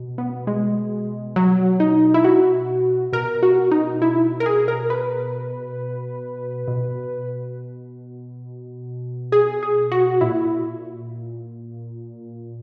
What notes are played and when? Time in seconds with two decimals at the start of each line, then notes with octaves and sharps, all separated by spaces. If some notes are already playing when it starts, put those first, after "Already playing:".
Already playing: B2
0.18 B3
0.47 G#3
1.36 F#3
1.80 D#4
2.14 E4
2.24 F#4
3.13 B2 A#4
3.43 F#4
3.71 D#4
4.02 E4
4.40 A#4
4.46 G#4
4.68 A#4
4.90 B4
6.68 B2
9.32 G#4
9.63 G#4
9.92 F#4
10.21 A#2 E4